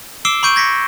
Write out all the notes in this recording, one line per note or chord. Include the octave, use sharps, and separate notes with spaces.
D6 E6 C7 D7 E7 G7
B5 C#6 G6 D7 D#7
G#6 A#6 B6 C#7